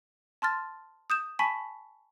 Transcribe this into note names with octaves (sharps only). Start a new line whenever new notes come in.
A5 C6 F6 A6
D#6 G6 E7
G#5 A5 B5 C#6 B6